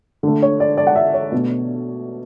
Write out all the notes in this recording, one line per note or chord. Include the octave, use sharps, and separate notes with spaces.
D3 A3
C#5
D5
D5
F#5
E5
C#5
B2 A3